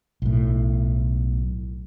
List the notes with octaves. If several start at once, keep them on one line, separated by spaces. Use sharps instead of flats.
B1 A2